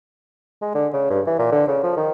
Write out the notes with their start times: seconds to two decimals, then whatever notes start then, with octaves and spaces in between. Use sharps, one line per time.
0.61 G#3
0.75 D3
0.93 C#3
1.10 G2
1.27 E3
1.39 A#2
1.52 D3
1.68 C#3
1.83 F3
1.97 D#3